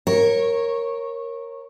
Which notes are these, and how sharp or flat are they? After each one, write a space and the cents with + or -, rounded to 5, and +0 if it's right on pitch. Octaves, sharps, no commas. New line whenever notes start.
A#4 +0 C#5 -20